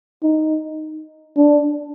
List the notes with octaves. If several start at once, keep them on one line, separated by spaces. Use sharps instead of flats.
D#4
D4